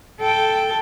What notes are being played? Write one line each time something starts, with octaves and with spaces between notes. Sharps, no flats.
A4 G5